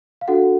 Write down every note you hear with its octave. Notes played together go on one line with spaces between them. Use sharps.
F5
D4 F#4 A4 F#5